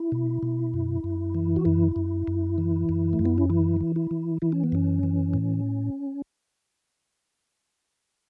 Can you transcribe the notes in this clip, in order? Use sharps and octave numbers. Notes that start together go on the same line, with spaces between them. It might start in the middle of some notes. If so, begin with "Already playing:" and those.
Already playing: E4
B2
B2
F#2
F#2
E3
F#4
F#2 E4
F#2
F#2
E3
F#2
A3
F#2
B3
C#4
E3 E4
E3
E4
E3
E3 E4
C#4
B3
F#2 C#4
E3
A2